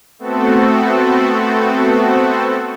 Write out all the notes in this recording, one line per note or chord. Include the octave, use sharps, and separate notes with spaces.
A3 B3 C4 F#4 A4